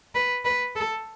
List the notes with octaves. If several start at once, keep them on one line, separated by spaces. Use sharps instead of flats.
B4
B4
A4